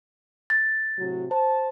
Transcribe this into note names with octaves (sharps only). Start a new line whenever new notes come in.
A6
A2 C3 F#3
C5 A5